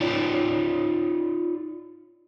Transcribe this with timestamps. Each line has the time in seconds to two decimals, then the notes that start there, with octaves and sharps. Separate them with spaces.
0.01 D#4 F4 C#5 D5